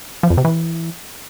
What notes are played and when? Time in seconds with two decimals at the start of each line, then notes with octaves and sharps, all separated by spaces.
0.23 F3
0.30 F2
0.37 C3
0.45 E3